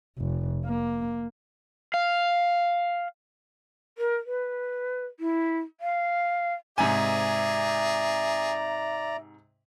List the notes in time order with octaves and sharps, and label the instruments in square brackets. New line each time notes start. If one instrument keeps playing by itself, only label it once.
[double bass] F1
A#3
[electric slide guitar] F5
[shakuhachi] A#4
B4
E4
F5
[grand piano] G#2 C3 G#5 [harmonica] G#4 [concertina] D5 A#5 [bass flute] E5